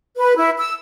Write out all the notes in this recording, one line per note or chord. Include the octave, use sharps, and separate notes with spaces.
B4
E4
E6